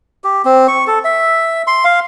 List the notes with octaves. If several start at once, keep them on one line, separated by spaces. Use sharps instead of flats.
G4
C4
C#6
A4
E5
C6
F5